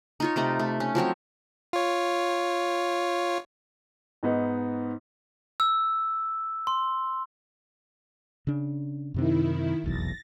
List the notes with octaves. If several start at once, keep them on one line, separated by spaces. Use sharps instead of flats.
D#4 F4 C#5
C3 A3 D#4 A#5
A3
C#4
F3 F#3 C4 C#5
F4 C#5
G#2 B3 D#4
E6
C6
C#3 D4
F#2 C3 D#3 C4 E4
F1 B1 E2 A6 A#6